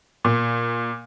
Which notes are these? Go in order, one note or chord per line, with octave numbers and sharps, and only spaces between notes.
A#2